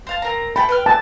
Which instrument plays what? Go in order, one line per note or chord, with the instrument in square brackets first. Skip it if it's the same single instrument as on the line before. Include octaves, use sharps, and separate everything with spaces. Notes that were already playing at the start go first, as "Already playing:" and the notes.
[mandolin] C5 F5 A5
C4 A#4 A#5
[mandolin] A4 G5 [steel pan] B5
[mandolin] B4 G5 F6
[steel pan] A5